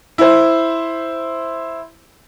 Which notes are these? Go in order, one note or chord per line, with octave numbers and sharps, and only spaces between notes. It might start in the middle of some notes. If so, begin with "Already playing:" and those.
E4 C5